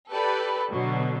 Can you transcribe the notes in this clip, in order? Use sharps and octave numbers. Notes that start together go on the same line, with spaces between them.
G4 A4 B4 D5
B2 D3 F#3